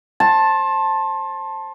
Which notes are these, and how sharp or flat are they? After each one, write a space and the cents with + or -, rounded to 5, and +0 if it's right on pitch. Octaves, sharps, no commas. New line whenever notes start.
C5 +30 A5 +0